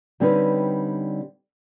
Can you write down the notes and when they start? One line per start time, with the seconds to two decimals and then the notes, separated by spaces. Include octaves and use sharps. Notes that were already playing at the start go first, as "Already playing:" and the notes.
0.20 D3 G3 C4 C#4 D#4 B4